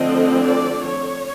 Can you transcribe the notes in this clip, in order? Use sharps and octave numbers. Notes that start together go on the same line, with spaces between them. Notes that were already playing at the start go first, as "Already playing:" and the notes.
Already playing: D3 F3 A3 C4 D#5
D5
C#5